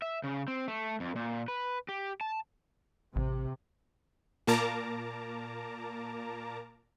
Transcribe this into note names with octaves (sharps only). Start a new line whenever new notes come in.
E5
C#3
C4
A3
F2
A#2
B4
G4
A5
A1 C3
A#2 A#3 A#4 A5 A#5 D6